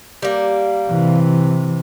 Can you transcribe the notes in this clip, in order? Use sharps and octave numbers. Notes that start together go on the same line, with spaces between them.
G3 A#3
C3 E3